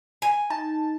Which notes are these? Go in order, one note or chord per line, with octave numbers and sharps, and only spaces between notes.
G#5
D#4 A5